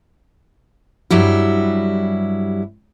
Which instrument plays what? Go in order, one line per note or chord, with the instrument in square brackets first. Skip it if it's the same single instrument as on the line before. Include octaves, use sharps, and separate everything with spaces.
[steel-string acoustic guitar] G2 F#3 G3 E4